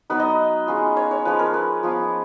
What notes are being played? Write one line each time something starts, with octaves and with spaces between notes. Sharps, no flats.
F#3 B3 D#4 B4
D#5
G#3 C#4 F4
C#5
C#5
F3 G#3 C#4 B4
A#4
B4
F3 B3 F4